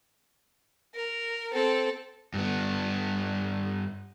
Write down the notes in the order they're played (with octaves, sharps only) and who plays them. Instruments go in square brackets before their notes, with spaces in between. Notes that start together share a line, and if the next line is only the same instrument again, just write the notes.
[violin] A#4
C4 A4
[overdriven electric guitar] G2 B3